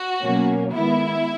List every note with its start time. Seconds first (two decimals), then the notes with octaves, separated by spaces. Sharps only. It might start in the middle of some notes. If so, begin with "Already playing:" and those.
Already playing: F#4
0.22 B2 F#3 A#3 C#4
0.73 D#3 G#3 B3 E4